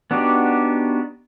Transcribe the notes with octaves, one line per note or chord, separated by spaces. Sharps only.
B3 D4 D#4 F#4 G4